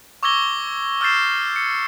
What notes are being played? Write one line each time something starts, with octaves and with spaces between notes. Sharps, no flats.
C#6 D6 E6 G#6 A#6 G7
E6 F6 G6 A6 C7 E7
C#7